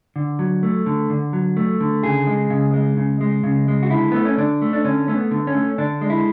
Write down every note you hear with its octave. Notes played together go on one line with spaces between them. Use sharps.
D3
F#3
A3
D3
D3
F#3
A3
D3
C#3 G#4
G#3
C#3
G#3
C#3
G#3
C#3
G#3
F#4
D3 E4
A3 B3
C#4
D3 D4
A3
D4
D3 C#4
A3 C#4
B3
D3
C#4
A3
D3 D4
G#3
E4